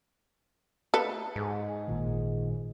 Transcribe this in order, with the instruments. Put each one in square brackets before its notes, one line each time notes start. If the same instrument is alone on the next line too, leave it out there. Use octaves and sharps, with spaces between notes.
[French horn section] A3 [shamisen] A4 B4
[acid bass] G#2 [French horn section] G#4
[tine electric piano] A1 A#2 D#3